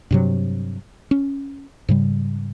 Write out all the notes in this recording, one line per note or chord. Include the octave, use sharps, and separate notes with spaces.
G2 C3 F#3
C#4
G#2 C#3 G3